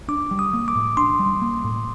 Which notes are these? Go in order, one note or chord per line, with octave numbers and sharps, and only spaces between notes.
D4 D6
G3
D#6
A#3
D6
A2
D4 C6
G3
A#3
A2